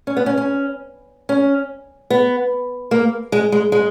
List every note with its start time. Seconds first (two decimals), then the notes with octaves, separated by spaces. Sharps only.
0.07 C#4
0.17 B3
0.26 C#4
0.38 C#4
1.29 C#4
2.10 B3
2.91 A#3
3.32 G#3
3.52 G#3
3.72 G#3